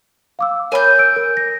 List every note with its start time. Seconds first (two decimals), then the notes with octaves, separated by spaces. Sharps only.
0.39 F5 D6 E6
0.72 A#4 C#5 G#5 B5 G6
0.99 E6 D7
1.16 A#4
1.37 A#6